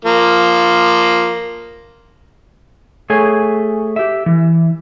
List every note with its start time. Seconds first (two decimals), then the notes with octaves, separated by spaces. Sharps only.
0.05 F3 A#3
3.10 A3 G#4 C#5 G#5
3.96 G4 E5
4.26 E3